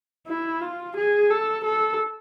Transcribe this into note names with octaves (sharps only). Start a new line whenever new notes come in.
E4
F4
G#4
A4
A4